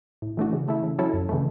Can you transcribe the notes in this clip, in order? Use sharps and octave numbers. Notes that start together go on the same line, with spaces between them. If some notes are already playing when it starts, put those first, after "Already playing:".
A2
E3 A3 D4 F#4
C#3
E3 A3 E4
C#3
F#3 C#4 E4 A4
F#2
C#3 E3 A3